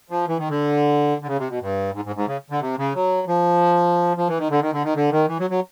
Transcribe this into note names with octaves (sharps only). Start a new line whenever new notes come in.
F3
E3
D#3
D3
D3
C#3
C3
B2
G2
G#2
G#2
G#2
C#3
D3
C3
C#3
F#3
F3
F3
E3
D#3
D3
D#3
D3
D#3
D3
D#3
E3
F#3
F#3